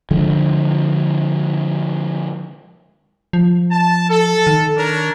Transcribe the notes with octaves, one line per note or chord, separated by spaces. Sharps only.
D3 F3 G#3
F3
A5
A4
D#3
D4 A#4 C#5